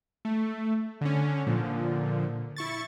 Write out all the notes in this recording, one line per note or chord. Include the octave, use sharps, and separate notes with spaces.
A3
D3 C#4
A#2 D3 F3
E4 C#6 A6